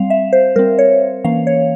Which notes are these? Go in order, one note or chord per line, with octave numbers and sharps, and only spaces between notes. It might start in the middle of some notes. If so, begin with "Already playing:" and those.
Already playing: G3 C4 F5
E5
C5
G3 C4 A#4
C#5
E3 A#3 C#4 F5
C#5